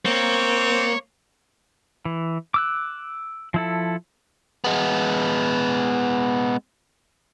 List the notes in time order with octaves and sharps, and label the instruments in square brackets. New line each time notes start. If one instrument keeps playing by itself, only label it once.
[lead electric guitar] A#3 [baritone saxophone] C4 [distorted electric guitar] C#5
[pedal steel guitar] E3
D6 E6 F#6
F3 E4 A4
[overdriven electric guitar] G#3 B3